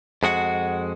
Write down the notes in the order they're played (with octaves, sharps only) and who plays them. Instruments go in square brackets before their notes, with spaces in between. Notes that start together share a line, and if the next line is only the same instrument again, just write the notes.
[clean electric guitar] F2 G#3 F#4 F#5